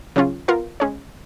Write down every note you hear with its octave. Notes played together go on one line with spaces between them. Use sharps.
C#3 F#3 C#4 F4
B3 F4 A#4 F5
G#3 C#4 G#4 C#5